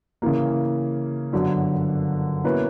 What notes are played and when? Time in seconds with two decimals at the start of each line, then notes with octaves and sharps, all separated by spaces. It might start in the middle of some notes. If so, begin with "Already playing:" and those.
0.22 C#3 E3 A#3
1.33 G1 F#2 D3 F#3
2.44 B2 A#3 C#4 E4 B4